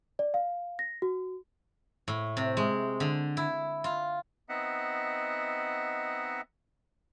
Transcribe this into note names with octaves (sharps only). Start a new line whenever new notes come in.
D5
F5
A#6
F#4
A2
C3
G#3
D3
E4
F4
B3 C4 D#4 D#5 E5 F#5